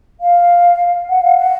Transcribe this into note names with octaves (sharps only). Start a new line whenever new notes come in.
F5
F#5
F5
F#5